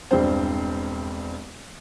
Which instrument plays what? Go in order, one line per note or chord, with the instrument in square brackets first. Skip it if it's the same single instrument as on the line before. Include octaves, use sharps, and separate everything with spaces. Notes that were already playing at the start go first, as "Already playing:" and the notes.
[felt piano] E1 G2 C4 C5